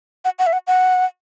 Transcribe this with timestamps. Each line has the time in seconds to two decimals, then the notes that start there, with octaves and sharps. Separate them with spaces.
0.25 F#5
0.39 F#5
0.47 E5
0.53 F#5
0.67 F#5